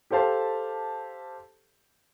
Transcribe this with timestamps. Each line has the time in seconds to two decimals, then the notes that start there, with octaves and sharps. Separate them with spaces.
0.11 G4 A4 C5 F5 A5